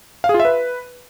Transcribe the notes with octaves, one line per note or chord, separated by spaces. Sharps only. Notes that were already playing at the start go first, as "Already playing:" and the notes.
F5
G#4
F4
E5
B4